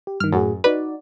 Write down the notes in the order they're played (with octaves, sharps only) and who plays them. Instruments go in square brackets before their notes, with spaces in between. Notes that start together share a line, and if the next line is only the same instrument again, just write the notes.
[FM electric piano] G4
[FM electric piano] G2 D#3 [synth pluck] F6
[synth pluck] F#2 [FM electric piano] A2 F#4 G#4
[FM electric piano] D#4 F#4 D5 [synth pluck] B4